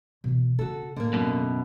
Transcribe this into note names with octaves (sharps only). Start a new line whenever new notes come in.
B2 E3
C#3 D4 F#4 A4
A2 D3 A#3
F#2 B2